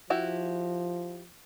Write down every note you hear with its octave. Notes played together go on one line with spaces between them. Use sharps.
F3 E4 F#4 G4